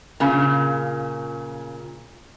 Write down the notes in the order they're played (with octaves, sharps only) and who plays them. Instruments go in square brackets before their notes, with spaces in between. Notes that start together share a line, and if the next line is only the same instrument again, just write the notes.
[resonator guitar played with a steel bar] A#2 C#3